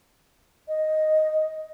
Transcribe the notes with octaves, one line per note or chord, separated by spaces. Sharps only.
D#5